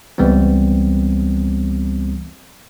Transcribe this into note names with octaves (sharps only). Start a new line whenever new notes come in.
C#2 E3 G3 B3 C4